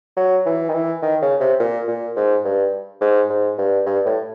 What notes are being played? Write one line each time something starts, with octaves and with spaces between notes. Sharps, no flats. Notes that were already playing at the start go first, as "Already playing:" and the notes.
F#3
E3
D#3
E3
D#3
C#3
C3
A#2
A#2
G#2
G2
G#2
G#2
G2
G2
A2